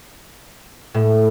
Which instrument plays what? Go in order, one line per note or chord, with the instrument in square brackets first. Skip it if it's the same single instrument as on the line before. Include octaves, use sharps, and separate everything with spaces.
[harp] A2